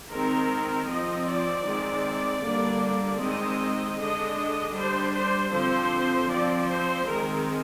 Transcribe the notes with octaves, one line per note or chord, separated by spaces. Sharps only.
D#3 G#3 C4 A#4
F3 C4 D#5
D5
D#3 G#3 C4
D3 G3 A#3 D4
D#3 G#3 C4 D#5
D3 G#3 D4 D#5
G3 D4 C5
C5
D3 F3 C4 C5
F3 C4 D5
C5
D#3 G#3 C4 A#4